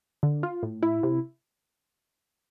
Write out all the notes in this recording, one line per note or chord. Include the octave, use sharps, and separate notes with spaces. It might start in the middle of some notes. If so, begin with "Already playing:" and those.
D3
F4
A2
E4
C3